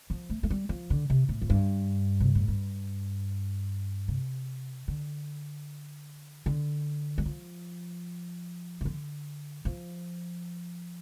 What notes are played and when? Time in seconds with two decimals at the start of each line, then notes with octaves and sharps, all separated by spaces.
0.10 F3
0.29 A3
0.43 A3
0.50 G3
0.69 F3
0.90 D3
1.10 C3
1.29 A2
1.42 F2
1.50 G2
2.20 C3
2.35 A2
2.48 G2
4.08 C3
4.88 D3
6.46 D3
7.18 G3
7.26 F3
8.81 C3
8.85 D3
9.65 F3